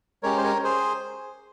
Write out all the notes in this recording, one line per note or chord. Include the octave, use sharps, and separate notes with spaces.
G#3 C#4 G4 A#4 C#5
C5
A#4 C#5
G#4 C5